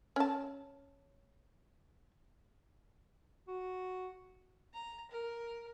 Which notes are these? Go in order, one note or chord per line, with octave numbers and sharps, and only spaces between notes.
C#4 A5
F#4
A#5
A#4